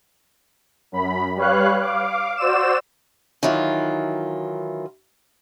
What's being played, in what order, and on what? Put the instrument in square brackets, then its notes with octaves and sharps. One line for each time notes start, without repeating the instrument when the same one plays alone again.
[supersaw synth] F#2 B5
G3 B4 C#5 F5 F#6
F5 D6
F#4 C5 D5 E6 E7
[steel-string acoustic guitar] D#3 E3 F#3 F4